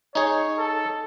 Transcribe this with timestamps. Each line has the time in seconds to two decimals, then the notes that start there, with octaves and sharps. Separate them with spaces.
0.15 D#4 G#4 C#5
0.58 A4